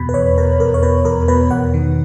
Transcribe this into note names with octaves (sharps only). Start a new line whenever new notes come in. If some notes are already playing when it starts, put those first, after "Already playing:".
Already playing: E2 B2 B5
B4
E2 C#5
B2 A#4
E2 A#4
C#5
B2 B4
E2 A#4
B2 B4
E2 F#5
D#3